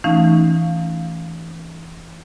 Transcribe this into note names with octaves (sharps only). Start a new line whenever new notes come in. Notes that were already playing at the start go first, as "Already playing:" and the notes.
E3 A3 C#4 D#4 F5